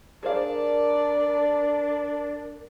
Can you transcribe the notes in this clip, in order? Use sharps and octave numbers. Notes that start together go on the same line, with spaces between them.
D4 G#4 A#4 C5 D5 F5 A5